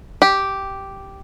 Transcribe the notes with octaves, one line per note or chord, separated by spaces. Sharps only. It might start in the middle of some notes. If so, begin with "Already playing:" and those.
G4